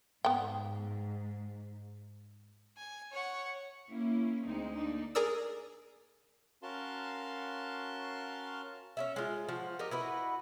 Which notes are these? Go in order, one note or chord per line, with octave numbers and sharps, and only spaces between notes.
G#2 B3 G5
G#5
C#5 F#5
A#3 C#4 E4
D2 G#3 C4 D#4
A#3 D4 D#4
G#4 A#4 D5 E6
C#4 F#4 A#4 F5 A5 C6
C#4 E4 E5
G#3 F4
F3 F#4
G4 A#4 D#5
E4 F#4 B4 D#5